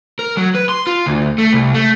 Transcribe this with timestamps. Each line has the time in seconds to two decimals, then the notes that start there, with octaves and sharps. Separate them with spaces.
0.19 A#4
0.37 F#3
0.55 B4
0.69 C6
0.87 F4
1.06 D2
1.38 A3
1.53 C2
1.74 A3